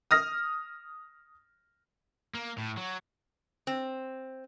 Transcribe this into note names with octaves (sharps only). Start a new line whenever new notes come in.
D#6 F6 A#6
A#3
A2
F#3
C4